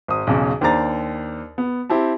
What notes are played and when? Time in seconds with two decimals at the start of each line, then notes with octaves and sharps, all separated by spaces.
0.08 G#1 D#6
0.27 B1 E2 C#3
0.61 D#2 D4 C5 D5 A#5 A6
1.58 B3
1.90 C4 E4 G4 A5